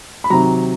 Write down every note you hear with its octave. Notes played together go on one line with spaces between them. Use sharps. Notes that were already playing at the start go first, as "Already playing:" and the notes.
B5
C3 D#3 F#3 A#5